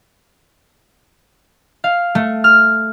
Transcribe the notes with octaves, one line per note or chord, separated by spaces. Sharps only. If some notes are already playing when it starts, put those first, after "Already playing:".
F5
A3
F6